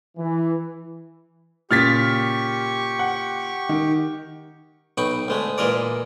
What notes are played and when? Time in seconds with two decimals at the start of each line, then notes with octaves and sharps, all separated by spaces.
0.18 E3
1.71 A#2 C#3 G4 C#6 F6 A6 B6
2.99 F#5
3.69 D#3
4.98 B1 D#4 G5 B5 C#6
5.28 D2 G#3 A3
5.58 A#2 E3 G#3 A#4 D5